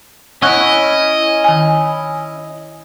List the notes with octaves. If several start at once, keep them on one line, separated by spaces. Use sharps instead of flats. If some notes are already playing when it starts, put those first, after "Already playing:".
C#4 E4 D#5 F#5 C#6 F#6
D#3 G#5